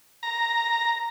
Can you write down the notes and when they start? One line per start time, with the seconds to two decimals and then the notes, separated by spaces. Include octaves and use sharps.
0.23 A#5